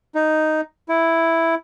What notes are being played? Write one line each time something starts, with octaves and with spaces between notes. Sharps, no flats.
D#4
E4